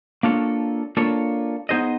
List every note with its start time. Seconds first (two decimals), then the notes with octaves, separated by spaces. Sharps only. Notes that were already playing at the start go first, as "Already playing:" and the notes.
0.23 A#3 D4 F4 A4 C#5
0.97 A#3 D4 F4 A4 C#5
1.69 B3 D#4 G#4 C5 D#5